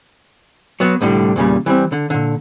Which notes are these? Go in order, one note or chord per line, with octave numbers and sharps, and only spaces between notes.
F#3 B3 F#4
C2 A2 D3 G3
E2 A#2 C#3 G3
E3 G3 C4
D3
A#2 D3